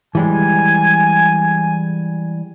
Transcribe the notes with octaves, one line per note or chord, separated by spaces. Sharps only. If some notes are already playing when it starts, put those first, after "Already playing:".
E3 G3 G#3 G#5